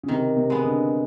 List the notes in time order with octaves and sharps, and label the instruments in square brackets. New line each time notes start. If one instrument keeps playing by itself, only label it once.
[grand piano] C#3
[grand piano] C3 [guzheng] D#3
[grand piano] C3
[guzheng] G#3 B3
[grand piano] D3